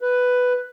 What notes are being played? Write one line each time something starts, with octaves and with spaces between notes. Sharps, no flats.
B4